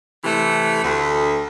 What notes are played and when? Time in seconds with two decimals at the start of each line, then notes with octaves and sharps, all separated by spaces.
0.24 C3 E3 A3
0.83 D2